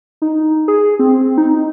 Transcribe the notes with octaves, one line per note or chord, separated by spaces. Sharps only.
D#4
G#4
C4
D#4